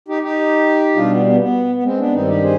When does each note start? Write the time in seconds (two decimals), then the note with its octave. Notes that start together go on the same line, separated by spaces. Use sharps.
0.08 D#4 G4
0.22 D#4 G4
0.95 B2 G3 D4 F4
1.11 B3
1.26 B3
1.40 B3
1.75 B3
1.83 G#3 C4
1.98 B3 D4
2.13 G2 D#3 G3 C4 D#4
2.27 D#4 G4
2.43 G#4 C5